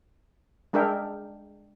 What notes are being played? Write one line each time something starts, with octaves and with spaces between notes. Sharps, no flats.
G#3 D4 G#4 A#4 E5 G5